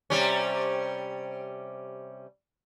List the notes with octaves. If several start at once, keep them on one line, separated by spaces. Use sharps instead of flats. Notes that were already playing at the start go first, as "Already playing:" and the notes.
C3 G3 C#4